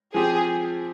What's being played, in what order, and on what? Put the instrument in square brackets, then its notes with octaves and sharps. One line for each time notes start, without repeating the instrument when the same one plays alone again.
[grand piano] F3 C4 G4 [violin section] G#4